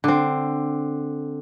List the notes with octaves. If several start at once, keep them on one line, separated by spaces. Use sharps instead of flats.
D3 C4